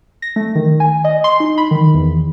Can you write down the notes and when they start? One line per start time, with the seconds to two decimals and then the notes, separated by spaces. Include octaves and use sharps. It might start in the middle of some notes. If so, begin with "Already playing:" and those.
0.22 A#6
0.36 A3
0.55 D#3
0.80 G#5
1.04 D#5
1.24 C6
1.40 D#4
1.58 B5
1.71 D#3
1.94 E2